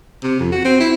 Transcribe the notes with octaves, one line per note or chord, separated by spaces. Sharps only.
C3
F2
F#4
C4
E4